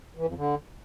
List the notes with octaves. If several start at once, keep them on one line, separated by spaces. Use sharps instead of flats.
E3
F2
D3